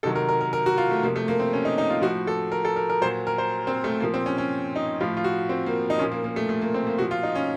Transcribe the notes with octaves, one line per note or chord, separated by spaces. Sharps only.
C3 D#3 F#3 A4
A#4
A#4
A#4
A#4
F#4
F4
A3
C3 F3 A#3
A3
A#3
C4
C#4
D#4
D#4
F4
A2 F3 F#4
A4
A#4
A4
A#4
A#4
A#2 F#3 C5
A#4
C5
C4
A3
A#2 F3 A#3
C4
C#4
C#4
D#4
A2 F3 F4
F4
F#4
C4
A#3
D#4
A#2 F3 C#4
A#3
A#3
A3
A3
A#3
C4
A#3
A#2 F3 F#4
F4
D#4
C#4